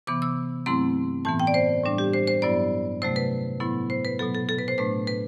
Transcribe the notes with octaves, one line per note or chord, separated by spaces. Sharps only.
C3 E3 B3 D6
E6
G2 F#3 A3 C4 E4 C6
A2 E3 B3 A5
G5
D5
C5
A2 G3 D4
G4
C5
C5
G2 F#3 B3 E4 D5
C3 F#3 A3 C5
B4
A2 F#3 B3 E4
C5
B4
B2 F#3 B3 A4
A4
A4
B4
C5
A2 F#3 A3 D4 B4
B4